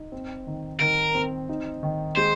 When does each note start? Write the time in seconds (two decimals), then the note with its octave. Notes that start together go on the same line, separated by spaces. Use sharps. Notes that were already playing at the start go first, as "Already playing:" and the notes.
Already playing: D#4
0.12 C4
0.47 D#3
0.80 D#3 A#4
1.15 C4
1.49 D#4
1.83 D#3
2.16 G#3 C5